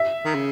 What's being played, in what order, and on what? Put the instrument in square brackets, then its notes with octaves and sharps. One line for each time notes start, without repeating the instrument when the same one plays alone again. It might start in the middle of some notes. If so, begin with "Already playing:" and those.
Already playing: [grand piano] E5
[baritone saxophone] D#3
C#3